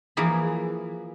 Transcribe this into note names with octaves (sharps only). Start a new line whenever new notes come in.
E3 F3 A#3 G#4 B5